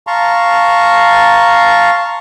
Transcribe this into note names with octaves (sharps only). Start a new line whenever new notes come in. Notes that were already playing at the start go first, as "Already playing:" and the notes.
F5 A5 A#5 C6 C#6